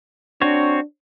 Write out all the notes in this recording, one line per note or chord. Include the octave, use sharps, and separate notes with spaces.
C4 D4 F#4 C#5